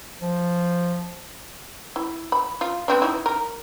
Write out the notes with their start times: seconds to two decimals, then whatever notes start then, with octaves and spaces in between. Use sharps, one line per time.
0.22 F3
1.96 E4
2.32 B5
2.61 F4
2.88 B3 C4 D4
3.02 D#4 E4
3.26 A#4